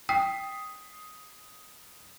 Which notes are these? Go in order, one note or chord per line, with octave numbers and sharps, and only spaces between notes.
G5 D#6 B6 C7